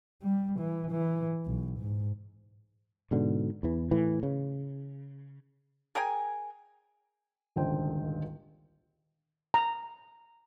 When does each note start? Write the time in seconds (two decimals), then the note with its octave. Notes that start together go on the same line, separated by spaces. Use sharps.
0.22 G3
0.59 E3
0.91 E3
1.46 B1
1.79 G#2
3.11 G#2 B2 D3
3.63 E2 E3
3.91 A2 E3
4.23 C#3
5.95 G#4 A#4 G5 G#5
7.56 D#1 G#1 C#2 D3 C5 G5
9.54 A#5